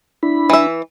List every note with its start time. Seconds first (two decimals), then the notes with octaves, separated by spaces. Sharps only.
0.23 D4 E4 B5
0.50 E3 E5